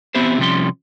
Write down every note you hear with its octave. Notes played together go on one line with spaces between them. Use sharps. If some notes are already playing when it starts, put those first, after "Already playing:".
E2 B3 C4 E4 G4 C5
C3 F3 G3 C#4 C6